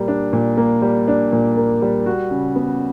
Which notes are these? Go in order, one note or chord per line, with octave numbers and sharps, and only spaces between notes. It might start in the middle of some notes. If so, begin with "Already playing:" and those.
Already playing: A#2 G3 A#3
D4
A#2
A#3
G3
D4
A#2
A#3
G3
F#4
C#3
B3